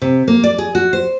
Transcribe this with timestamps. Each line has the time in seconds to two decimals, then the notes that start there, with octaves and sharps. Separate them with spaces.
0.02 C3
0.28 A#3
0.44 D5
0.58 G#4
0.75 F#4
0.93 C5